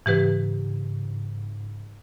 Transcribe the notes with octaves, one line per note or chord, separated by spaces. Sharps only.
G#2 C#3 E3 G4 B4